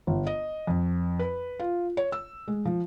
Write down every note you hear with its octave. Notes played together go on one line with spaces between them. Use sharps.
G1
D#5
F2
B4
F4
C#5
E6
G#3
F3